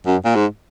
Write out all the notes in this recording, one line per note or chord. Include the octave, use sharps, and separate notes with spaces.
F#2
A#2
G#2